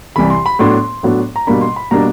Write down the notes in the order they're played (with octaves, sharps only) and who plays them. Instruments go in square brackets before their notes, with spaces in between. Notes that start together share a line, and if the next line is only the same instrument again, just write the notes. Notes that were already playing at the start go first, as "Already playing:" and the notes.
[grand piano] C2 C3 E3 B5
C6
B5
A2 F#3 B3 D4 C6
A2 F#3 B3 D4
A#5
B2 G3 A#3 D4 B5
C6
B5
B2 G3 A#3 D4 A#5